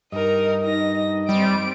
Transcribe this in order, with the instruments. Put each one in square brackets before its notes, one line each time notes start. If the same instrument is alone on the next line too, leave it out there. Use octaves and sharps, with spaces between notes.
[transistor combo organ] G2 D#5 [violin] D#4 A#4
[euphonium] D#4 [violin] A#6
[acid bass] G3 [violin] C4 D7